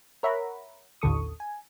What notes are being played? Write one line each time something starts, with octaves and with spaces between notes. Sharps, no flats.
A#4 C#5 E5 F#5 A#5 B5
A1 D#2 D3 A4 C#6 D#6
G#5